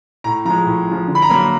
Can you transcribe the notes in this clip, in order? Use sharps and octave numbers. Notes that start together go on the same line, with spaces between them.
A2 A#5
F3 G#3 A#5
A2
F3 G#3
D3
B5
A#5
F#3 A#3 B5